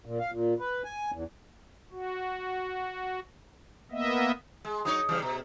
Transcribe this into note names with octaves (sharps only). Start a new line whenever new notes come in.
A#2
F5
A#2
B4
G#5
E2
F#4
A#3 B3 D#5 E5
G#3
F#3 D#4 C#5 D#6
C#3 E3 G3
B2 A#5